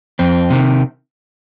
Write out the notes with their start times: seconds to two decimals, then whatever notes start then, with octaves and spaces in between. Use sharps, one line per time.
0.19 F2 C4
0.50 C3 D#3